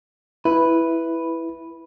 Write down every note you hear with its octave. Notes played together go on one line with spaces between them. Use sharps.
E4 B4